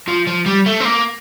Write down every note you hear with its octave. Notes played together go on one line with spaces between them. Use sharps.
F3
F3
G3
A3
C4
A#3